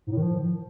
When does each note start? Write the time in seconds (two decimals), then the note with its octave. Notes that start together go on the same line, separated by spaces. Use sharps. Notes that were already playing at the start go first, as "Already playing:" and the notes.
0.07 G#2
0.12 A2
0.17 D#3
0.22 F3